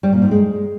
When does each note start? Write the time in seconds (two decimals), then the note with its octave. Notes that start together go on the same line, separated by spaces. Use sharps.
0.03 G3
0.13 A#2
0.22 G#2
0.31 G#3